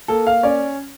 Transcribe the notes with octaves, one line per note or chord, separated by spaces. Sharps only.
A#3 A4
F5
C#4 D5